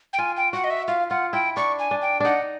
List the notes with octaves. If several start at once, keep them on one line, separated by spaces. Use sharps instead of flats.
G5
F4 G#5
G5
F#4 F#5
D#5
E5
F4 F5
F4 F#5
E4 G5
D4 C#6
G#5
D4
G5
D4 D#4 F#5